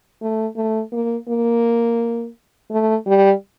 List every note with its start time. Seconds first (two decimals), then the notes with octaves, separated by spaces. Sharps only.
0.22 A3
0.57 A3
0.92 A#3
1.29 A#3
2.71 A3
3.06 G3